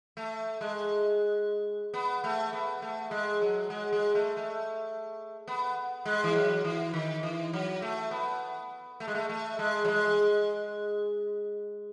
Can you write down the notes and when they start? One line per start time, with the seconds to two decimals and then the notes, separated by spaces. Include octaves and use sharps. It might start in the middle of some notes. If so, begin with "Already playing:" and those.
0.17 A3
0.61 G#3
1.94 B3
2.24 A3
2.53 B3
2.82 A3
3.11 G#3
3.42 F#3
3.70 G#3
3.92 G#3
4.15 A3
4.37 A3
5.48 B3
6.05 G#3
6.24 E3
6.36 F#3
6.65 E3
6.93 D#3
7.23 E3
7.53 F#3
7.82 A3
8.11 B3
9.00 A3
9.08 G#3
9.15 A3
9.29 A3
9.59 G#3
9.85 F#3
9.88 G#3